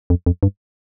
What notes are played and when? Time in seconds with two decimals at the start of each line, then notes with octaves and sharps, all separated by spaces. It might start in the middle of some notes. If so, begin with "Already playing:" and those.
0.10 F2
0.26 F2
0.43 G2